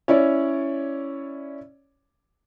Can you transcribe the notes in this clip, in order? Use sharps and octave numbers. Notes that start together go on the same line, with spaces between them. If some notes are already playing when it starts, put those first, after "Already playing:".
C#4 E4 C#5 D5